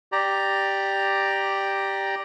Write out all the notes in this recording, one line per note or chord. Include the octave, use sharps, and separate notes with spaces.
G4 D5 A#5